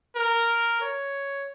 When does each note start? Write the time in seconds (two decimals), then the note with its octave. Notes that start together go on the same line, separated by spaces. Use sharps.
0.16 A#4
0.81 C#5